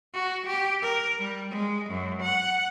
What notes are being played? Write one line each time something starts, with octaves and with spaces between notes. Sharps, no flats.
F#4
G4
A#4
G3
G#3
F#2
F#5